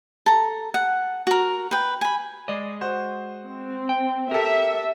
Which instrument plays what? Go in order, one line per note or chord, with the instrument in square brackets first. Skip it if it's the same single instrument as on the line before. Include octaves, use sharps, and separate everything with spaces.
[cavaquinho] A4 A#5
F#5
F#4 A#4
B4 G5
G#5 B5
[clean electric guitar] G#3 D#5 [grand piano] D5
[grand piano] F#4 C5
[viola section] C4
[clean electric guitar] G5
[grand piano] G4 A4 [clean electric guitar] A#4 [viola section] E5